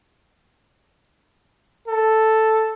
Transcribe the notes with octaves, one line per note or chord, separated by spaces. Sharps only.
A4